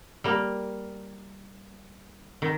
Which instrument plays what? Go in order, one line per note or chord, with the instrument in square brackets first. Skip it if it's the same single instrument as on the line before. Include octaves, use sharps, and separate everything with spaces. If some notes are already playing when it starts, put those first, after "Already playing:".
[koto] G3 A#3
D#3